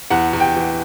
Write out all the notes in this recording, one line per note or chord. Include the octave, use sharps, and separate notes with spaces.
E2 F#5
E2
G5
E3